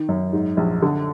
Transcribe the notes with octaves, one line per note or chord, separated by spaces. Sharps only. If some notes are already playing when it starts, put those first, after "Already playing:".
Already playing: D#3
F#2
G#2
A#1
D3